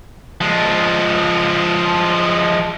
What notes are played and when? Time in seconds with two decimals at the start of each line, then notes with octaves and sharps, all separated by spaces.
0.41 F3 G#3